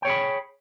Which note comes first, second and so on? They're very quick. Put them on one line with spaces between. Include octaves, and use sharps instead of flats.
G5 C#5 G#4 B5